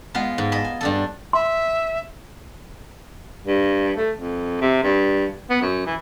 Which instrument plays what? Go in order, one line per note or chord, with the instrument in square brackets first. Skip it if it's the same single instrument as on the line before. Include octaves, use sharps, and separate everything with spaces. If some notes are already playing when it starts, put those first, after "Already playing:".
[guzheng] G#3 B3 F4
G#2
D#5 A5 B5
G#5
G2 D4 A4
[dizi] E5 [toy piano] C6
[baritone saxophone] G2
A3
F2
C3
G2
B3
F#2
E3